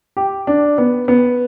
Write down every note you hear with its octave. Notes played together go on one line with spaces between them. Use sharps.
G4
D4
B3
B3